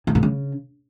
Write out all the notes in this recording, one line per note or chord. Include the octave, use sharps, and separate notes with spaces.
A2
A#2
C#3